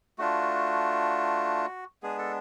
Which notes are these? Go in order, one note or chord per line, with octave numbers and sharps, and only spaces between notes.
A3 D4 F4 F#4
G#3 B3 D4 G#4
A4